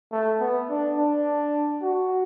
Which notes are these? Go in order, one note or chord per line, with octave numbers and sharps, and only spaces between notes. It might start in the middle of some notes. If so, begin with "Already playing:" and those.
A3
B3
D4
D4
F#4